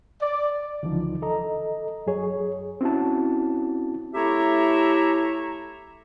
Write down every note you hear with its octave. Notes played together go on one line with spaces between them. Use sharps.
D5
C#2 D3 E3 F3 D#4
A4 D#5 A#5
F#2 F#3 G#4 C#5
C4 C#4 E4 F#4 A5
A3 E4 G4 C#5 E5 A#5